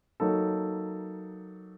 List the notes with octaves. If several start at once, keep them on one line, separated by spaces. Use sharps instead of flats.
F#3 A#3 D#4 A4